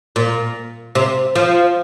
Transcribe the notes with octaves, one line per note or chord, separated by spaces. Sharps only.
A#2
C3
F3